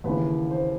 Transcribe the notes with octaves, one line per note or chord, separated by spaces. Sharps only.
D#2 C#3 E3 B4
C5